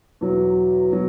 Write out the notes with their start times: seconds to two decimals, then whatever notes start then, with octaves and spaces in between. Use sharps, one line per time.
0.21 E2 B2 F#3
0.92 B2 F#3